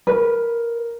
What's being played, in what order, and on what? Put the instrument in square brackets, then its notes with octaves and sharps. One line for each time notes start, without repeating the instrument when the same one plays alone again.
[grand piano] A#4 [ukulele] B4